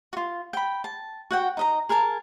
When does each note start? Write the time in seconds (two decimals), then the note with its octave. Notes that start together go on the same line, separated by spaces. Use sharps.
0.13 F4 F#4
0.53 G5 B5
0.84 A5
1.31 F#4 F#5 G5
1.57 D#4 D#5 A#5
1.89 G#4 A#4 G#5 A5